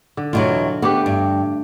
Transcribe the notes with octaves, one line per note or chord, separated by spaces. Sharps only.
D3
E2 B2 F#3 F4
A3 B3 D4 G4
G2